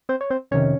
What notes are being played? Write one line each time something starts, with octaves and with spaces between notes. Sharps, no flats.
C4 C5
C#5
C4 C5
F2 C3 D#3 C#4 C#5